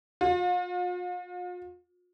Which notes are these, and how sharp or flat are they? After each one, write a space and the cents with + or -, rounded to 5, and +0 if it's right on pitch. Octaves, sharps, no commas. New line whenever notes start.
F4 +40